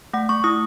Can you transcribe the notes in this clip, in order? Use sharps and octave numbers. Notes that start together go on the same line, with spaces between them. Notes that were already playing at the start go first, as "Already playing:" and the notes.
A3 F#5
A3 C#6
E4 D#6